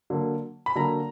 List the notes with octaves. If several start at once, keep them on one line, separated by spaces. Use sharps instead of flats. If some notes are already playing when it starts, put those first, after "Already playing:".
D3 F#3 A#3
B5
D3 F#3 A#3 A#5